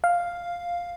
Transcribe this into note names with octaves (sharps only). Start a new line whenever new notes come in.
F5